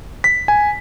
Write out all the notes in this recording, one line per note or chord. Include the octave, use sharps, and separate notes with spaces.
B6
G#5